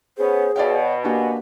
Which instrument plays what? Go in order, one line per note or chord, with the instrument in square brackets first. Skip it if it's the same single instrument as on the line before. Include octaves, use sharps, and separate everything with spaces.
[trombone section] B3 C#4 [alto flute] G#4 [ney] C5
[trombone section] B2 [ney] C#5 [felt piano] D5 F5 G5
[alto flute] A#3 [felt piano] D4 F#4 G4 [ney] G#5